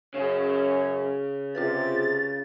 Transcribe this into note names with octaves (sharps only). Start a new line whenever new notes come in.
F#2 C#3 C#4 G#4
C3 F4 G#4 B4 A6